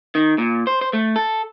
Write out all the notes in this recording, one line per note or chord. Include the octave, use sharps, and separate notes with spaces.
D#3
A#2
C5
C5
A3
A4